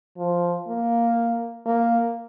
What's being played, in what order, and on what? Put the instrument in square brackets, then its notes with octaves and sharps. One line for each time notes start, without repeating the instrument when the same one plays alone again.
[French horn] F3
A#3
A#3